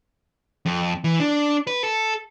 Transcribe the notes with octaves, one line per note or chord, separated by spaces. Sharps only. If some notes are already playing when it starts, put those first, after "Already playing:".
F2
E3
D4
B4
A4